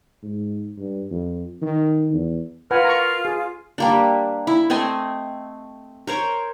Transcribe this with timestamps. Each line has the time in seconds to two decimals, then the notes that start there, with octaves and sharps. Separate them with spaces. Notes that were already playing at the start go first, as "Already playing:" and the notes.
0.23 G#2
0.78 G2
1.11 F2
1.62 D#3
2.13 E2
2.71 F4 A#4 B4 F#5 G#5
2.85 A#5 C#6
3.25 G#4
3.78 G3 A#3 D4
4.47 E4
4.70 A3 C4 D#5 G#5
6.07 A#4 C5 C#5